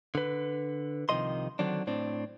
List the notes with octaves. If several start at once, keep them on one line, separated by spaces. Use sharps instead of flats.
D3 B4
C2 C3 D#3 F3 D#5 C6
D3 D#3 F#3 C4 D4
A2 C4 D4